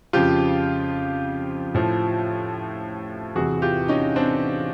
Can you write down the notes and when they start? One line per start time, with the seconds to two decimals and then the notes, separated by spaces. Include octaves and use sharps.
0.13 F2 C#3 F3 F4 G4
1.74 A2 F3
3.35 E2 C3 E3 F#4 G#4
3.62 F4 G4
3.88 C#4 D#4
4.16 C4 D4